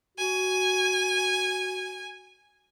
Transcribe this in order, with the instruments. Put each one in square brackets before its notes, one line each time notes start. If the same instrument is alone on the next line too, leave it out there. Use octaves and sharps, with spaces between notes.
[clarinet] F#4 [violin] G#5